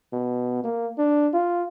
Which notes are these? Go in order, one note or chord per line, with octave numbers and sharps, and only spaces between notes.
B2
A#3
D4
F4